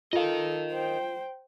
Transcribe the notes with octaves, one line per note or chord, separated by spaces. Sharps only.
F4 A4 A#4 D#5 F5
C5 G5